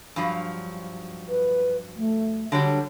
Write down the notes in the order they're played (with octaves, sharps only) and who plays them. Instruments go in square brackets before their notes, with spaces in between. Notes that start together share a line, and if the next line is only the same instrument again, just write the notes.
[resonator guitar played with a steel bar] G2 F3 F#3
[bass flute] B4
A3
[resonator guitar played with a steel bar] D3 F#3 G3 [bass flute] C#5